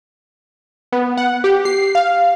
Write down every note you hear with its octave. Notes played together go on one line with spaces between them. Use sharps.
B3
F#5
G4
C7
F5